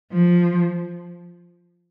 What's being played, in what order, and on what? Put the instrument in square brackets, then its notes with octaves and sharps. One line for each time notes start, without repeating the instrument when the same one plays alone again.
[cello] F3